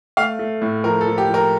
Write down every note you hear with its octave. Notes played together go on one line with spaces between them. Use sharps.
A3 F5
A3
A2
F3 A#4
A4
F3
G4
F3
A#4